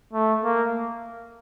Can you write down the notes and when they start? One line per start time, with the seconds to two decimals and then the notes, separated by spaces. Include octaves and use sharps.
0.13 A3
0.43 A#3